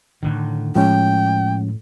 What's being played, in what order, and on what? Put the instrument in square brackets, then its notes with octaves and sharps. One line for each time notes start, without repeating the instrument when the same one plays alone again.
[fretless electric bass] A2 D3 D#3
[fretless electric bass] A2 [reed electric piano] F3 G#3 C#4 [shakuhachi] G5